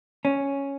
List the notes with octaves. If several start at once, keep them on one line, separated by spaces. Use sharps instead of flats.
C#4